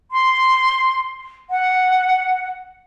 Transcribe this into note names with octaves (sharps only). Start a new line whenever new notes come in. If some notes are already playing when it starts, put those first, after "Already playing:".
C6
F#5